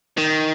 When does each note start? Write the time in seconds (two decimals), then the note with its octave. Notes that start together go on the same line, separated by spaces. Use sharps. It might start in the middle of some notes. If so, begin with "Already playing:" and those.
0.17 D#3